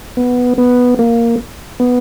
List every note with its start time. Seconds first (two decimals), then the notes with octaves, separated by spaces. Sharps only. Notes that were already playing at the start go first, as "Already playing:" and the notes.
0.17 B3
0.58 B3
0.99 A#3
1.80 B3